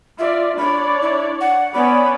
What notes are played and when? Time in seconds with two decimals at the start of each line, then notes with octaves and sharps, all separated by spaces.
0.19 F4 D5 E5
0.57 D4 C#5 D5 B5
1.01 E4
1.41 F#5
1.73 B3 C#4 D5 B5